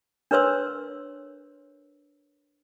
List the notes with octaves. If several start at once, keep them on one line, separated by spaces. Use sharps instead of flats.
D4 A#4 B4 C#5 C6 E6